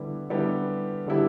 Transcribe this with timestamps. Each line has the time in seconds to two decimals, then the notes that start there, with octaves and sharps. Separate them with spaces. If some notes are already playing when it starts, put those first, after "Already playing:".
Already playing: D3 G3 B3 E4 G4
0.30 D3 G3 B3 E4 G4
1.06 D3 G3 B3 E4 G4